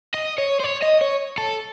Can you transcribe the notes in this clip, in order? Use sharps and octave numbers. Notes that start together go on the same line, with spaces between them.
D#5
C#5
C5
C#5
D#5
C#5
A4